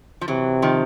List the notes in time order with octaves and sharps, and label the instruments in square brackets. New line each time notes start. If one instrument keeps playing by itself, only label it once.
[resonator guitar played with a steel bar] F3
[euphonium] C3 [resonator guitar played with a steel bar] E3 F#3
[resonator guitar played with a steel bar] D#3 F3